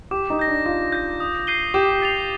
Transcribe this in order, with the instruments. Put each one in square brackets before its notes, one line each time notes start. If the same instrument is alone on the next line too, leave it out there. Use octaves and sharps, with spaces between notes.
[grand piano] G4 [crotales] D6
[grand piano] D#4
[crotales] G6 A#6
[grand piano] D4
[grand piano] F4 [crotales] D6
[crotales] G6 A#6
D#6
G6 C7 D#7 G7
[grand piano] G4 [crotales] D6
[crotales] A6 C7 F7